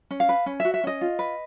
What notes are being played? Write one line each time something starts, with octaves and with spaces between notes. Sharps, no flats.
C#4
F5
B4
C#4
F#4 E5
E5
C#4 D#5
F4
B4